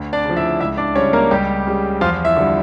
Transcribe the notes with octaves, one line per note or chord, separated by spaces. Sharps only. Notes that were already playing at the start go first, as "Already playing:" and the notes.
Already playing: D2
D4 D5
C#3 F3
E4 E5
C#2 E4 E5
D4 D5
C#3 G3 C#4 C#5
A#3 A#4
C#2 G3 G4
C#3 G3
E2 F3 F4
E4 E5
D3 G3